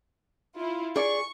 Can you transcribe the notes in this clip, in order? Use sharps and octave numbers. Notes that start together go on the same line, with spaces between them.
E4 F4
G#4 D5 C#6